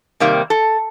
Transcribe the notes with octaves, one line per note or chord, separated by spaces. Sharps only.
C3 D#3 G3 A#3
A4